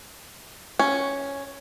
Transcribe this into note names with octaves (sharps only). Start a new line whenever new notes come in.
C#4